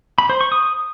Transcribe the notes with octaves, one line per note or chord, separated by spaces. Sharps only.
B5
C5
C#6
D#6